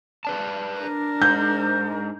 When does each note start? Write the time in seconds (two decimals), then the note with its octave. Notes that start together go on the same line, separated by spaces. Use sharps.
0.25 B4 D5 A5
0.80 D4 A#4
1.22 G#2 G6